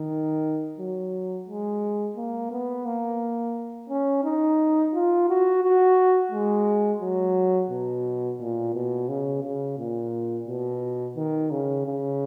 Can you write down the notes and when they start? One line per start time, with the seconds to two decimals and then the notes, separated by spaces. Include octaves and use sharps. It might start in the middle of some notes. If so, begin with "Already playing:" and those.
Already playing: D#3
0.78 F#3
1.48 G#3
2.17 A#3
2.51 B3
2.86 A#3
3.90 C#4
4.24 D#4
4.94 F4
5.29 F#4
5.63 F#4
6.32 G#3
7.02 F#3
7.70 B2
8.40 A#2
8.75 B2
9.09 C#3
9.44 C#3
9.78 A#2
10.48 B2
11.17 D#3
11.51 C#3
11.86 C#3